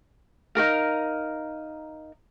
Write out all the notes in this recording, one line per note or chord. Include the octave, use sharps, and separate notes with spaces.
D#4 F#4 A#4 F5